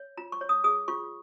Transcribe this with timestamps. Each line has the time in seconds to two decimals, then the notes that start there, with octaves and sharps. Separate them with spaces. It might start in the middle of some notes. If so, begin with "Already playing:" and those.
Already playing: C#5
0.17 F4 A#5
0.32 C#6
0.41 C#5
0.49 D#6
0.64 G#4 D#6
0.88 F4 C#6